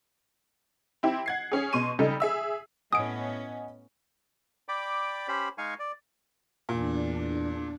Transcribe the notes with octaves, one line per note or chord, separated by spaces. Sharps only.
C4 E4 G4
F#5 G#6 C7
C#4 G#4
B2 C6 C#6 D#7
C#3 G3 D#4 A4 B5
G#4 E5 E6
A2 B3 C#4 D#5 F#5 G#5 D#6 D7
D5 G5 B5 D6
C#4 G4 C5 B5
G#3 D#4 F5 G#5 C#6
D5
E2 A#2 D4